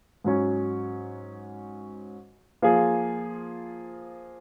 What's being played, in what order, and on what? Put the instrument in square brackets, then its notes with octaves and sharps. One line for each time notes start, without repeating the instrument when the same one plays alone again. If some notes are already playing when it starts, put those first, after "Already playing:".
[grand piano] G#2 F#3 C#4
F3 A#3 F4 G#4